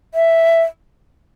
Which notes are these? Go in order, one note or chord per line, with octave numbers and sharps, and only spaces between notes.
E5